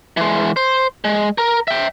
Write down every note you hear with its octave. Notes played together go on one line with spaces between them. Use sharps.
E3 G#3
C5
G#3
A#4
E5 G5